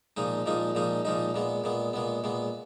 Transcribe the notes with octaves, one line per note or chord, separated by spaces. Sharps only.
A#2 F3 G#3 D#4
A#2 F3 G#3 D#4
A#2 F3 G#3 D#4
A#2 F3 G#3 D#4
A#2 G#3 B3
A#2 G#3 B3
A#2 G#3 B3
A#2 G#3 B3